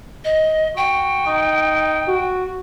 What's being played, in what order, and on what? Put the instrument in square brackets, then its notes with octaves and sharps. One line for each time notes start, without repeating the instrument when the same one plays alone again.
[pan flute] D#5
[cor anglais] F#4 [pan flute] G5
[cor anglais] D#4
[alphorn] F#4